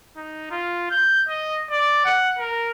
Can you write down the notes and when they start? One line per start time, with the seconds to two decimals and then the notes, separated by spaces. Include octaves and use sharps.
0.16 D#4
0.51 F4
0.91 G6
1.29 D#5
1.71 D5
2.05 F#5
2.39 A#4